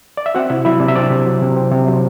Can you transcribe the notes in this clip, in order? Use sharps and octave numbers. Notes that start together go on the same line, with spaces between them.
D5
E5
C4 F#4 F#5
C3 E4 E5
F#3 E4 E5
C3 D5
E5
C4 D4 D5
C3
F#3
C3
C4
C3
F#3